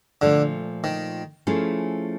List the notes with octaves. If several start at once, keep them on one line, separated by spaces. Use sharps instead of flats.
A#2 D3 F3 A3
D#3
F3 A3 C#4 E4 G#4